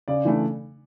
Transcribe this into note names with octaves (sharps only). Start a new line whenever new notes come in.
C#3 D5
E3 A3 D4